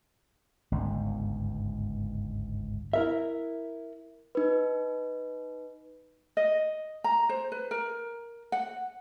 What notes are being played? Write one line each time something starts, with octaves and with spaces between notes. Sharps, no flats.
G1 C#2 G#2
E4 A#4 E5
D#4 B4
D#5
A#5
C5
B4
A#4
F#5